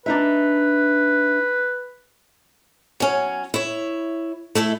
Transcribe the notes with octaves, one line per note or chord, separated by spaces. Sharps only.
D4 D#4 B4 E5
F#3 C#4
E4 C#5
A3 E4 A4 E5